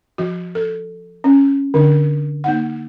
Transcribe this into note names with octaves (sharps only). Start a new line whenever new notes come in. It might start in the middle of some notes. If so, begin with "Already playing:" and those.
F3 F#4
A4
C#4
D3 D4
A#3 D#4 F#5